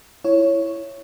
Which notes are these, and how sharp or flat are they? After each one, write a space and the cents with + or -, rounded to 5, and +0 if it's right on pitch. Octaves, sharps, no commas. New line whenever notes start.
E4 +15 C#5 +0